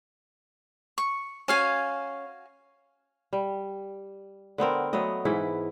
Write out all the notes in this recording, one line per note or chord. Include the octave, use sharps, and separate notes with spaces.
C#6
C#4 F#4 F5 G#5
G3
D3 B3 C4 A#4
F#3 A3 B3 D#5
G#2 E3 E4